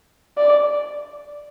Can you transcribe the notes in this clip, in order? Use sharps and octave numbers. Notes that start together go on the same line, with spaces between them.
D5